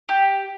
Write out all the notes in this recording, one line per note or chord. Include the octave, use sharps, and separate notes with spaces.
G4